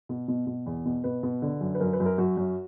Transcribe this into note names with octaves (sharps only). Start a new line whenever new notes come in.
B2
B2
B2
E2
B2
B2 B4
B2
D3
F#2
B4
F#2 A#4
B4
F#2
A#4
F#2 F#4
F#2